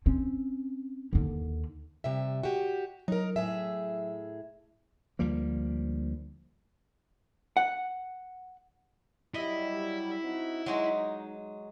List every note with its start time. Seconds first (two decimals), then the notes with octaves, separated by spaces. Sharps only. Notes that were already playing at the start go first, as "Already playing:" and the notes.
0.06 C4 C#4
1.13 D#2 D3
2.04 C3 G3 E5
2.43 F#4 G4
3.08 F#3 D#4 A#4
3.36 A2 G#4 E5
5.19 D2 F3 G3 A#3
7.57 F#5
9.34 F#3 G3 E4 D#5
10.22 C4 D#4 F#4
10.66 F#3 G#3 D#4 F#4